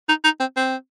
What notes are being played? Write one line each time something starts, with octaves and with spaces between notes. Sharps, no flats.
D#4
D#4
C4
C4